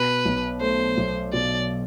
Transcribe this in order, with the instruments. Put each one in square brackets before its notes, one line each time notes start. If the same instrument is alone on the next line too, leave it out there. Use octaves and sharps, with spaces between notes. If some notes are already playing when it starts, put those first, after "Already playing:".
Already playing: [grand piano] B2 [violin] B4
[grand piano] B1
[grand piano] A3 [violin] C5
[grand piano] B1
[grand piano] B2 [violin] D5